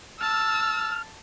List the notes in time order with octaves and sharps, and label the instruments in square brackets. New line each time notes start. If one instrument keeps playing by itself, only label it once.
[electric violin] A5 [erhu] E6 [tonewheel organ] F6